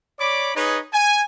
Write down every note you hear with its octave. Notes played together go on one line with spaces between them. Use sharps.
C#5 D5 B5 D6
D#4 G#4 B4 C#5 D#5
G#5